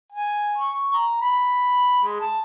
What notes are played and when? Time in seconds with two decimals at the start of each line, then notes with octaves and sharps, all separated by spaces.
0.12 G#5
0.58 C#6
0.93 A#5
1.21 B5
2.03 G#3
2.20 A5